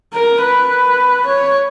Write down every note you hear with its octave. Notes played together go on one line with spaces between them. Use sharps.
A#4
B4
C#5